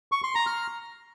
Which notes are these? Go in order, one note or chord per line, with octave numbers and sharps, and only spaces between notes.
C#6
C6
A#5
F6